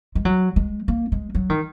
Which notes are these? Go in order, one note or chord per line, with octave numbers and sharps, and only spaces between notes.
G#3
F#3
G#3
A#3
G#3
F#3
D#3